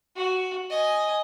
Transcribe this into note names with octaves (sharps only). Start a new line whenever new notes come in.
F#4
D#5 G#5